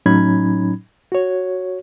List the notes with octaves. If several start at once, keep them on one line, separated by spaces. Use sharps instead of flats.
A2 F#3 C#4 D#4 B5 G#6
F#4 C#5